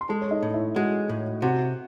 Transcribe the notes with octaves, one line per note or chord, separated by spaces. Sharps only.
C6
G#3 A4 A5
C#5
D#4 D#5
A2
E4 E5
G#3 F#4 F#5
A2
C3 F#4 F#5